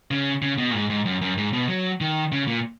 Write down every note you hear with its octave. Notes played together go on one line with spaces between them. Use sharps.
C#3
C#3
B2
A#2
G#2
G#2
F#2
F#2
G#2
B2
F#3
D#3
C#3
A#2